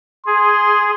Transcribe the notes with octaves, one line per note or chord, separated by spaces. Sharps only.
G#4 C6